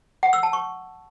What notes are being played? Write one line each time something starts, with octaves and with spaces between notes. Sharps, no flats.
F#5
E6
A5
C#6